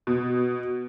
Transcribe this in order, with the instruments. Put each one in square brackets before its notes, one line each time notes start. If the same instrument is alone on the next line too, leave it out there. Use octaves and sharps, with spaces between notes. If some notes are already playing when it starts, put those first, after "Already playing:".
[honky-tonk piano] B2